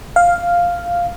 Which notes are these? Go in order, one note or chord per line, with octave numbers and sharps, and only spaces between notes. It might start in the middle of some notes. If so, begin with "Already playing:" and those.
F5